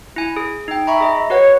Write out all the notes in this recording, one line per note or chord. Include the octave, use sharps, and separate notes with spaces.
E4 G#5
G#4
D#4 G5
E5 A#5 B5 C#6
G#4 D#5
F#4 B4 C#5 F#5